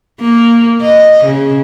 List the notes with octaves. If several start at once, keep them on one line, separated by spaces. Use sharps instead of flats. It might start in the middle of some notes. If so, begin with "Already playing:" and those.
A#3
D#5
C#3